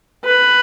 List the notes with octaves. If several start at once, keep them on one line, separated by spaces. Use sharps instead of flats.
B4